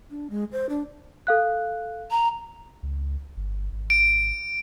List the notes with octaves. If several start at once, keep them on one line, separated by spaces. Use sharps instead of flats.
D4
G#3
C5
D4
A4 F5 F#6
A#5
C#2
G1
G#1
D7